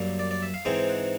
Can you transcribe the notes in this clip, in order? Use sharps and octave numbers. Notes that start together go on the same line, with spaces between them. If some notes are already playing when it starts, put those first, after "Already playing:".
Already playing: F#2 D3 G3 A#3
D5
D5
E5
F5
G#2 E3 G#3 C4 D#4 G5
F#5